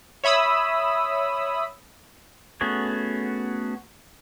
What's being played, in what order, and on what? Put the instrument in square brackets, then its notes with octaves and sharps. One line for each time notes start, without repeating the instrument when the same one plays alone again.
[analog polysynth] C#5 E5 B5 D#6 E6
[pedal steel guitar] A3 B3 C#4 F#4 G#4